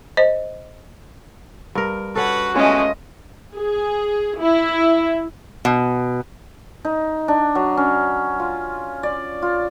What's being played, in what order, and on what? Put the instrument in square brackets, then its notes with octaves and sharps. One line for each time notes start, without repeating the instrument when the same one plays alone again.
[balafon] C5 D#5
[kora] G2 A#4
[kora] C#4 A4 [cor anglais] F#4 [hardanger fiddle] B4 F#5
[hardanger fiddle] G#3 A3 [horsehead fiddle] C#4 D#5 [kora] F4 B4 C#5
[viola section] G#4
E4
[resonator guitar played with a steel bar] B2
[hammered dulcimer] D#4
D4
F#3
C#4
F4
D5
F4